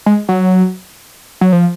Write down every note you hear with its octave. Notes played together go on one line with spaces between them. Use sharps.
G#3
F#3
F#3
F3